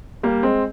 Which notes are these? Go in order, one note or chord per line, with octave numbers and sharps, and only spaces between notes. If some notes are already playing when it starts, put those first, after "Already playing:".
G3 A#3
G#3 C4